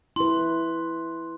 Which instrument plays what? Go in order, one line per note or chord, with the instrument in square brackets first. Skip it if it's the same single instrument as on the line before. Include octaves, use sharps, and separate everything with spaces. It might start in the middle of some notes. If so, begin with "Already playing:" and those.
[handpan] E4 B4 [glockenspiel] C6